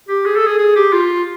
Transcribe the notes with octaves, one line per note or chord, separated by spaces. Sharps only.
G4
G#4
A4
G#4
G#4
G4
F4